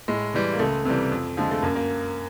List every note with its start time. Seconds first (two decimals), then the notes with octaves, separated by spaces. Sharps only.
0.08 A2 G#3
0.34 E3 G3
0.54 A#3
0.59 C#2 A3
0.85 C3 E3 G3
1.12 F2
1.37 D3 F3 G#3
1.51 A3
1.62 F#2 A#3
1.75 A#3